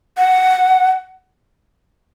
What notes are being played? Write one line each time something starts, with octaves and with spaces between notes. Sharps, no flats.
F#5